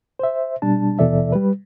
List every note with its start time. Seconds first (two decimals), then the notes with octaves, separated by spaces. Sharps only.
0.19 C5 E5
0.62 B2 G3 D4 A5
0.99 D#2 B2 E3 A4 D5 E5
1.32 G3 B4